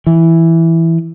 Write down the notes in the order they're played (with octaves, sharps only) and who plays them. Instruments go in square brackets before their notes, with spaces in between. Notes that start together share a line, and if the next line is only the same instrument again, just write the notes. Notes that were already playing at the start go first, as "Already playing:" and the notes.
[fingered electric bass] E3